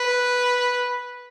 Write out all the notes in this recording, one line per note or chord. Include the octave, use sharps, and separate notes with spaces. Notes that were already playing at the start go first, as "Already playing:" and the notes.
Already playing: B4